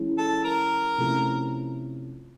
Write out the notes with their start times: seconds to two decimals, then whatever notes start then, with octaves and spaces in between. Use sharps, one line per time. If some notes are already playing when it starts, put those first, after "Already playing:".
Already playing: E3 G#3 C#4 E4
0.18 A4
0.44 A#4
0.98 C3 F3 A3 C#4 E4